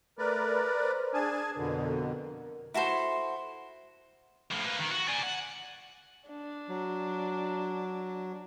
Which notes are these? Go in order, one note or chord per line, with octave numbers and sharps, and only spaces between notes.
A3 A#4 B4 D5
C5
D4 G#4 G#5 A5
F2 B2 D3 A#4
E4 F#4 A4 C5
A2 F3
A#3 B4
D#3
F#4
D5 G#5
F#5
D4
F#3